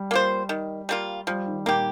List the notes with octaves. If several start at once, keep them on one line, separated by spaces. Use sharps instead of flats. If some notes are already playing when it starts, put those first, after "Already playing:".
Already playing: G3
A#3 F4 C5
D#3
G3 A#3 F4
F3 G3
D#3
A#2 A#3 G4